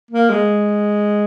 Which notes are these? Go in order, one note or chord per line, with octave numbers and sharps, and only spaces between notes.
A#3
G#3